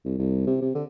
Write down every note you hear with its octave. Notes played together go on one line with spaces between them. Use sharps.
C2
C2
C3
C3
D3